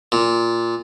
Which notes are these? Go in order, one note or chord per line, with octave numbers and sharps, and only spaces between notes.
A#2